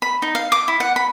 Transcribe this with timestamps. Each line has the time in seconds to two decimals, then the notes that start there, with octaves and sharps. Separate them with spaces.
0.02 B5
0.22 D#4
0.35 F5
0.52 D6
0.68 E4
0.80 F#5
0.96 B5